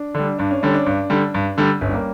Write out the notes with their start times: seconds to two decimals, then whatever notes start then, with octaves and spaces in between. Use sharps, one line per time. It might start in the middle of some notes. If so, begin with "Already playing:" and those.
Already playing: D4
0.15 D3 G3 D4
0.39 G2 D4
0.51 C#4
0.63 D3 G3 C#4
0.74 D4
0.86 G2
1.10 D3 G3
1.34 G2
1.58 D3 G3
1.81 G1 C#4
1.89 G3
1.94 A#3